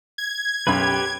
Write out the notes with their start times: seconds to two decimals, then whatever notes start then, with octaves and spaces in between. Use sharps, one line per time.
0.18 G#6
0.67 B1 F#2 G4 B4 B5